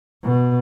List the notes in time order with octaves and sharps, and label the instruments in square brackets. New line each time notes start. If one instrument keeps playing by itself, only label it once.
[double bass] B2